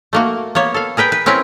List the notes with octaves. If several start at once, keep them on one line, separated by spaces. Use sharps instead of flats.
A3 A#3 F#4
A#3 B3 C#5
A4 F5
G#4 A#4 B4 G5
B4
C4 C#4 E4 A#4 B4